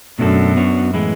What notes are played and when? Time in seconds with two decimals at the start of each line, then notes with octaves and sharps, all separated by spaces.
0.19 F#2 B2 A3 D4 F#4 A4
0.56 B3 D4 F#4 C#5
0.94 A2 E3 G#3 B3 E4